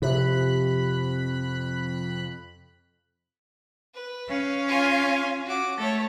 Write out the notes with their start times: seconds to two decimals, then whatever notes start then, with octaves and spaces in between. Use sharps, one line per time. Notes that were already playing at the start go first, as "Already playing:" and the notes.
0.02 F2 C3 B5 F#6
3.94 B4
4.29 C#4 F5
4.68 F4 G#5
5.46 F#4 D6
5.78 A3 A4 C#5